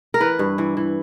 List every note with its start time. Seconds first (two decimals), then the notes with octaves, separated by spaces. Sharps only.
0.14 A#4
0.20 E3 B4
0.39 G2
0.58 E3
0.77 E3